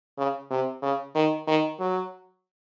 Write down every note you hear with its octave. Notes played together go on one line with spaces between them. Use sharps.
C#3
C3
C#3
D#3
D#3
F#3